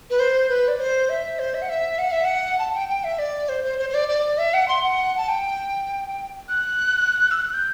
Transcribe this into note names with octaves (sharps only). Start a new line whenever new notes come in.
B4
C5
B4
D5
C5
E5
C5
E5
F#5
E5
F#5
E5
F#5
A5
G5
G5
E5
D5
C5
C5
C5
C5
D5
D5
E5
F#5
C6
F#5
A5
G5
F#6
E6
F#6
G6